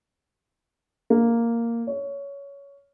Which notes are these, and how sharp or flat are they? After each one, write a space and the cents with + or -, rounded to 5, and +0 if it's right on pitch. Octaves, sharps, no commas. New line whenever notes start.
A#3 -5
C#5 +15